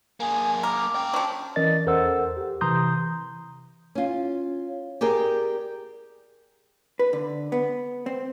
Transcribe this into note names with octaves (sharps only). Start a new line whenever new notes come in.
A#3 G#4 G#5
A#4 D6
C#4 G5
F3 F#3
E3 C#4 A#4 D5 D#5 A6
E2 A4 A#4 C5 F#5 E6
G4
C3 E3 A#5 C6 D#6 G6
C#4 F4
G4 G#4 A#4 D5 G5
B4
D3
B3
C4